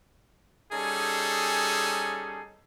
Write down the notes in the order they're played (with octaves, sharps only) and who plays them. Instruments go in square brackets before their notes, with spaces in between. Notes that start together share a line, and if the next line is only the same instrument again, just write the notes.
[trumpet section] G3 C#4 D#4 G#4 A4